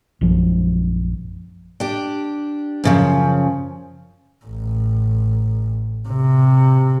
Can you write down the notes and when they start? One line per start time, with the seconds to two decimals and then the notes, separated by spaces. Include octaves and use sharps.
0.21 A#1 F#2 F3
1.80 D4 G4
2.84 F#2 C#3 F3
4.45 A1
6.09 C3